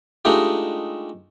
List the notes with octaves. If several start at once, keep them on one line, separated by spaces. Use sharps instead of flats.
G#3 A3 D4 D#4 F4 G4